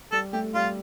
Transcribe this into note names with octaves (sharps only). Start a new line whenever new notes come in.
G3 A4
A3 G4
G3 F4